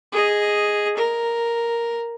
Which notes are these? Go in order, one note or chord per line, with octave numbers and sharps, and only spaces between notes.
G#4 D#5
A#4